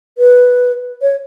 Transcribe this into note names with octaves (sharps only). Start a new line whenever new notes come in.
B4
C#5